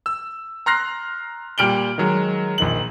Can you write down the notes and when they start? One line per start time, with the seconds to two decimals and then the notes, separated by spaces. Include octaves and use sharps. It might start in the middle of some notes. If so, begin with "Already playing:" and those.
0.06 E6
0.66 A#5 C6 F6 F#6 A#6 C7
1.58 A#2 G3 F6 D7 F#7 G7
1.98 D#3 F#3 G#3
2.58 A#1 D#3 F#7